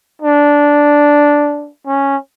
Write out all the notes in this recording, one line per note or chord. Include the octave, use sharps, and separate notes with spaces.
D4
C#4